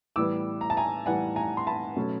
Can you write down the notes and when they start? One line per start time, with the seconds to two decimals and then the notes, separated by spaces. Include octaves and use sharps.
0.16 A2 E3 G3 B3 D6 E6
0.61 A#5
0.70 A5
0.77 G#5 A#5
1.06 A2 E3 G3 B3 F#5 G#5
1.36 G#5 A#5
1.57 C6
1.67 A5 B5
1.96 B2 F#3 A3 C#4